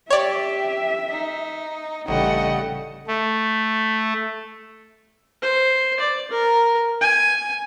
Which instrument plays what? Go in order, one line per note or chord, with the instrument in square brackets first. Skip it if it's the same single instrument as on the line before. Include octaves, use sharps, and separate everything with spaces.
[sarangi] G4 [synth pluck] C#5 D5 [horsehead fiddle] E5
[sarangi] D#4
[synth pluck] A1 [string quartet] C#3 G3 A3 [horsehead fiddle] D#5 [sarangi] F#5
[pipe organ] A3
[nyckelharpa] C5
D5
A#4
G#5